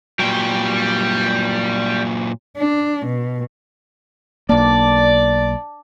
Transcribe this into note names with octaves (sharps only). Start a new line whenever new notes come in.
A#2 F#3 G3 G5
D4
B2
B1 A#3 D4 D5